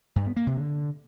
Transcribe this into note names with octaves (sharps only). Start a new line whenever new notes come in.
G2
B3
A#3
C3
D3